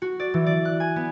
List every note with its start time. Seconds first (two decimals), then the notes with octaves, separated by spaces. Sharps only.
0.02 F#4
0.20 D5
0.34 E3
0.46 D5
0.65 F#6
0.80 G#5
0.96 B3